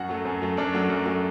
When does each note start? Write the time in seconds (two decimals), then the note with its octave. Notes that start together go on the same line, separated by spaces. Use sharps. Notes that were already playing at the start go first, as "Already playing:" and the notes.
Already playing: F#2 F#4 F#5
0.09 F#3 A3
0.25 F#2
0.42 F#3 A3
0.57 F#2 D4 D5
0.73 F#3 A3
0.90 F#2
1.06 F#3 A3